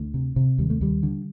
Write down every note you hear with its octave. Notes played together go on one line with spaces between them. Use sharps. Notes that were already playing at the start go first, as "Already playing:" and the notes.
Already playing: D2 A3
C3
C3
D#2 G3
A3
D#2 G3
D3